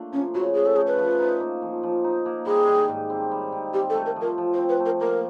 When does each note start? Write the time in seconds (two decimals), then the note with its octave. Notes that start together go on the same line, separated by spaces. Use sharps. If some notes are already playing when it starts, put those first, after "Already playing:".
Already playing: A3 A#3 D4 F4
0.12 F3 C#4
0.34 C#3 F#4
0.55 C#4 G#4
0.66 A4
0.76 A3 G#4
0.87 B4
0.97 F3
1.19 D#4
1.40 A#3
1.62 F3
1.83 F3
2.04 D#4
2.26 A#3
2.46 G3 G#4
2.68 D#3
2.89 G#2
3.10 C4
3.32 G3
3.52 D#3
3.74 C4 G4
3.90 A4
3.95 A3
4.06 A#4
4.16 F3
4.21 A#4
4.38 F3
4.54 C5
4.58 C4
4.69 B4
4.80 A3
4.86 A#4
5.01 A#3 A#4